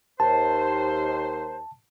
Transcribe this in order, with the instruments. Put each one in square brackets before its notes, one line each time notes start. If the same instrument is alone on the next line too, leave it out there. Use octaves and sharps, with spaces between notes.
[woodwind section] D#2 C5 [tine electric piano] A5